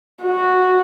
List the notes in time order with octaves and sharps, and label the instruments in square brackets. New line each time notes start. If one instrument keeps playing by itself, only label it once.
[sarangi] F#4